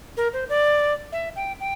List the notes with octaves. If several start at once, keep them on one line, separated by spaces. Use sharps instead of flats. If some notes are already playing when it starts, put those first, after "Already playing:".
A#4
C5
D5
E5
G5
G5